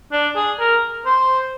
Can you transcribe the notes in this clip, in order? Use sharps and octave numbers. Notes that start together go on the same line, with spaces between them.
D4
G#4
A#4
C5